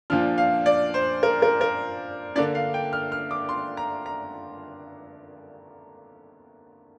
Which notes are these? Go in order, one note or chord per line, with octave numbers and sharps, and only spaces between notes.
A#2 F3 D4 F6
F5
D5
C5
A#4
A#4
A#4
D3 A#3 D4 D5
F5
G5
F6
F6
D6
C6
A#5
A#5